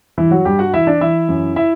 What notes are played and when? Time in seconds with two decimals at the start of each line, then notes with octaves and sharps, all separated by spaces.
0.17 G2 E3 E4
0.31 F#3 F#4
0.45 G2 G3 G4
0.59 F#4 F#5
0.74 E3 E4 E5
0.87 D4 D5
1.01 E3 E4 E5
1.29 F#2
1.56 E4 E5